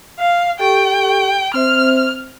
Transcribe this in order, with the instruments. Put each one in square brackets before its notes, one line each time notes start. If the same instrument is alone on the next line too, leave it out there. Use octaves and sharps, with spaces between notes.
[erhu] F5
[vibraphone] G4 A4 C#6 [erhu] G5
[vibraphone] C4 C5 E5 [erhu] F6